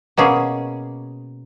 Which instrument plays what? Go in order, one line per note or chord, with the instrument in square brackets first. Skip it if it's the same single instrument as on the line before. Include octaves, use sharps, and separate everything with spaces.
[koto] B2 A#3 C#4 G#4